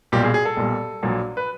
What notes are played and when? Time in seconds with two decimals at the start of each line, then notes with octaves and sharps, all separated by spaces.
0.12 B1 A#2 G3 G4
0.24 G#4
0.34 G#4
0.45 A4
0.57 B1 A#2 G3
1.03 A#1 A#2 F#3
1.37 B4